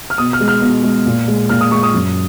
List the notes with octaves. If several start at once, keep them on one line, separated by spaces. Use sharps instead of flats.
F6
B2 D#6
F6
G#3
F6
B2
G#3
A#2
G#3
A#2 F6
D#6
G#3 C#6
D#6
F#2